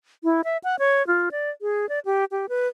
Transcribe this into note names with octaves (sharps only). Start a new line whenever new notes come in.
E4
E5
F#5
C#5
F4
D5
G#4
D5
G4
G4
B4